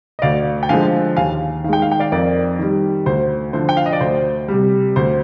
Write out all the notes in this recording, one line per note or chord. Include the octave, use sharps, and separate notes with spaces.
D#5
D2 D5 F5
G5
D3 F3 G#3 F5 G#5
D#2 F5 G#5
D#3 G#3 F5 G5
F5
G5
D5 F5
F2 A#4 D5
D#3 G3
D2 C5
D3 F3 C5
G5
F5
D#5
D5
D2 C5
C3 G3
D2 C5